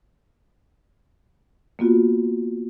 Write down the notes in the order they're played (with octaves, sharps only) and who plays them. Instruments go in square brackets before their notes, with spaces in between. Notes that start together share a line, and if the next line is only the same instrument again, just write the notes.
[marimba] A#3 B3 F4 F#4